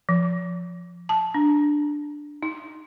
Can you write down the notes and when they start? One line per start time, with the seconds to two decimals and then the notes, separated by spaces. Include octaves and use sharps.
0.09 F3
1.09 A5
1.34 D4
2.43 D#4